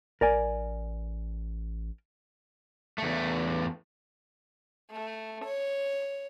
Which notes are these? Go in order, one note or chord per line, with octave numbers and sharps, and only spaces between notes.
A1 A#4 D5 G#5
E2 A3
A3
C#5